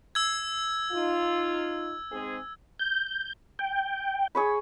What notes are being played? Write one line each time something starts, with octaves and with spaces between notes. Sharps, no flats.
E6 G#6
D#4 F4
G#2 C4 G#4
G6
G5
G#4 C#5 B5